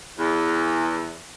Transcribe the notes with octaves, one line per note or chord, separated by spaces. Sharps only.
E2